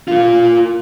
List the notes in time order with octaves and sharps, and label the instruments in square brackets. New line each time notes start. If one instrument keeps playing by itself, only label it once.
[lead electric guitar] A#3 F4